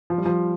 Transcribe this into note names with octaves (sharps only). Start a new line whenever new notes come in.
F3
G3
F3